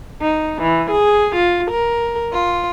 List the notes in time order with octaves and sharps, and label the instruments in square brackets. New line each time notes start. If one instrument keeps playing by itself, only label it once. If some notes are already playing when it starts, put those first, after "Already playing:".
[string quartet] D#4
E3
G#4
F4
A#4
F4